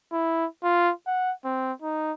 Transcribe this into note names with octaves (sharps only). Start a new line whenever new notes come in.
E4
F4
F#5
C4
D#4